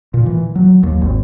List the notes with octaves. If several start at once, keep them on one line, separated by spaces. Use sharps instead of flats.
A#2
E3
F#3
D#2
G#1